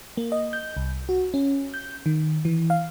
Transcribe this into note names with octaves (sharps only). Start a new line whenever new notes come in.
A#3
D#5
G6
C2
F#4
C#4
G6
D#3
E3
F5